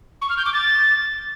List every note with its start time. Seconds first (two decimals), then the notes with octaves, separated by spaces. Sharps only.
0.22 C#6
0.30 F6
0.37 G6
0.45 D6
0.53 A6